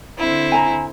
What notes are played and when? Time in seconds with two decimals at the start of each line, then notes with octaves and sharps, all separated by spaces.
0.17 D3 C4 E4
0.52 G#5 A#5